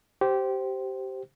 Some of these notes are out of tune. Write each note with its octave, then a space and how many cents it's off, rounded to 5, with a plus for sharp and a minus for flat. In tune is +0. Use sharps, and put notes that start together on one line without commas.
G4 -20 C5 +0